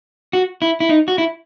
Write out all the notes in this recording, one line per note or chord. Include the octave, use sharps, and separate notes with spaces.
F#4
E4
E4
D#4
F#4
E4